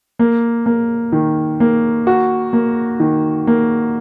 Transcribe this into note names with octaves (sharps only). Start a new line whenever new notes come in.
A#3
A#3
D#3
A#3
F#4
A#3
D#3
A#3